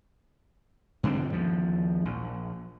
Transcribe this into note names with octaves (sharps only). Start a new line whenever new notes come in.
G2 D3 C4
D#2 F3
A#1